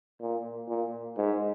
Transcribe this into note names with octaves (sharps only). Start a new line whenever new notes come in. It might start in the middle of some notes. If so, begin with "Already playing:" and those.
A#2
A#2
G#2